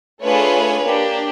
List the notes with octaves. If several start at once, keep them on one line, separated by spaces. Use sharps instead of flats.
A3 D4 F4 G#4 B4 C#5
A#3 D4 G4